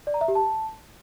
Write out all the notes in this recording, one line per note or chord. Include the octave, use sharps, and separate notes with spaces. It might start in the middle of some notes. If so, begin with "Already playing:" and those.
D5
A#5
E5
G4
A5